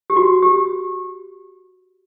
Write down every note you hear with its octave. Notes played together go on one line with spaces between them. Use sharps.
G4
F#4
G4